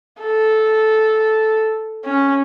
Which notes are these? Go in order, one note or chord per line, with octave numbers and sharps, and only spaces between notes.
A4
C#4